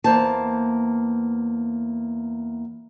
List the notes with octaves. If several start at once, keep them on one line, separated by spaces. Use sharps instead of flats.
E2 A#3 C5 A5